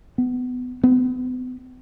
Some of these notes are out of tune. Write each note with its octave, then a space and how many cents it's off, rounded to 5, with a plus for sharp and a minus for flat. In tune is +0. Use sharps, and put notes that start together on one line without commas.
B3 +20
B3 +40